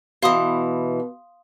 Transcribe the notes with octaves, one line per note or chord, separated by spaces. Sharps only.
B2 E3 F5 C6 D#6